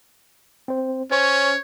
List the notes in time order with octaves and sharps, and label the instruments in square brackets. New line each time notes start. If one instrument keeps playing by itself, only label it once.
[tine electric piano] C4 C5
[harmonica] C#4 [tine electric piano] C5 [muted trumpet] C#5